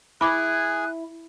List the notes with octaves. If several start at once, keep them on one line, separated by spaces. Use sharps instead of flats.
E4 G#4 G#5 B5 D6 F#6